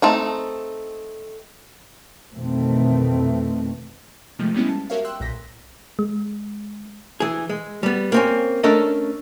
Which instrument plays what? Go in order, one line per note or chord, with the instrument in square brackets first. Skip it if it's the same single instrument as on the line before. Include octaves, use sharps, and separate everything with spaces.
[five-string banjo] A3 C4 D#4
[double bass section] F2 B2 D#3 E3 A3 C4
[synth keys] C3 D#3 F3 G#3 A3
G3 G#3 B3 C#4 E4
A5
F#4 G4 A#4 C#5 E5 F5
G5 C6 E6 F#6
B1 A#2 G6 A#6 B6
[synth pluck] G#3
[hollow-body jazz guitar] E3 G#4
G#3
G3 B3
A#3 C4 C#4
A3 C#4 D4 A4 A#4 D#5